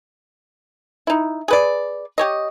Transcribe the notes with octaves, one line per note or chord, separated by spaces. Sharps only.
D#4 E4
G#4 B4 D5
G4 C#5 D#5